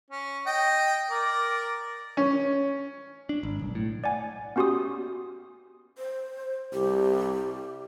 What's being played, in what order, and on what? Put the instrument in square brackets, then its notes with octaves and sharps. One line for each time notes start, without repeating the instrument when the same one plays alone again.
[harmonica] C#4
D#5 G5
A#4 D5
[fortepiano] C#4
[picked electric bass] D4
G#1
B1
A2
[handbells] D5 F#5 G#5
B3 C#4 F#4 G4 C6 D#6
[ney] C5
[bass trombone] C2 [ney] G4